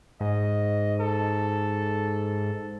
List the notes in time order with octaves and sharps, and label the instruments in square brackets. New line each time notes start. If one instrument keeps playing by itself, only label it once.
[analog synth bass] G#2 [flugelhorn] D#5
[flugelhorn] A4